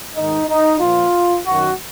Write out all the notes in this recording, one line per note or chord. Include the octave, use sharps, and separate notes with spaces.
G#2 D#3 D#4
D#4
A#2 F3 F4
F#2 D#3 F#4